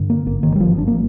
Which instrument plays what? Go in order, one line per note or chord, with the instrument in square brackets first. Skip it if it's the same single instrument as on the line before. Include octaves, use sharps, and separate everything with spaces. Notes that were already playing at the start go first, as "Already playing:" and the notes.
Already playing: [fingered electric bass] G2 D3
A#3
G#1 A#3
D#3
G3
G#1 F3
D4
A#3